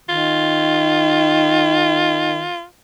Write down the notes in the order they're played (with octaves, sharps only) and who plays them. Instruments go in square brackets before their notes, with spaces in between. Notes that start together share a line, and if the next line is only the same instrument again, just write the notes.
[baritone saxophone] D#3 [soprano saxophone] F4